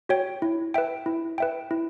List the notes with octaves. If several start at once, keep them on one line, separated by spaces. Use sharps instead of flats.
F#4 C#5 G5
E4
B4 E5 G5
E4
B4 E5 G5
E4